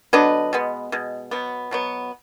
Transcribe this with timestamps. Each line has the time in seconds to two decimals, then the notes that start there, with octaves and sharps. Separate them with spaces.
0.13 D3 F#3 B3 D4 B4 D#5
0.53 B2 G#3 B3
0.92 B2 G#3
1.31 B2 F#3 B3
1.71 B2 F#3 B3